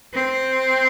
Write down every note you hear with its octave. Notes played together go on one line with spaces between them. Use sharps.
C4